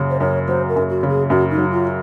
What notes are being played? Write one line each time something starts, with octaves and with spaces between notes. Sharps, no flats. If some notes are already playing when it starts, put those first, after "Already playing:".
Already playing: F#2 C#3
C5
F#2 C#5
F#3 C5
A#4
F#2
F#4
C#3
G#4
F#2 F#4
D#4
F#3
F4